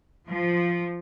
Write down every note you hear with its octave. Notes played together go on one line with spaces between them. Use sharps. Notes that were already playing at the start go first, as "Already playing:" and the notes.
F3